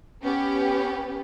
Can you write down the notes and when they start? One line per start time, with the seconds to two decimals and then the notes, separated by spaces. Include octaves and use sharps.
0.22 B3 C#4 G4